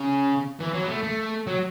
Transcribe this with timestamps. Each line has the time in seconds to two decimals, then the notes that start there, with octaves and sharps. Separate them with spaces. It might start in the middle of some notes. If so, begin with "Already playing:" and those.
Already playing: C#3
0.60 E3
0.74 F#3
0.84 B3
0.89 A3
1.03 A3
1.47 F#3